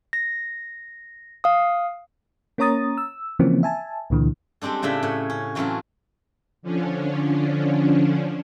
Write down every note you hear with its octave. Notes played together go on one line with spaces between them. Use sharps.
A#6
F5 D#6
A#3 C#4 C#5 A#5 D#6 A6
E6
C#3 E3 F3 A#3 C4 C#4
E5 G#5 A5
C#2 A#2 D3 E3
G3 G#3 C4 D4 A4
A2 C#3 D4 E5 G5
A2 B4 C#5
C#4
E3 F#3 A3 C4 C#4 F4
D3 F3 C#4 D4